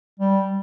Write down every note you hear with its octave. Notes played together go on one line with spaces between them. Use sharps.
G3